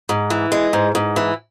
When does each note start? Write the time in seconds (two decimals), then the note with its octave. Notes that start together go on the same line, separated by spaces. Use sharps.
0.09 G#2
0.30 E3
0.52 G#3
0.73 G#2
0.95 G#2
1.16 E3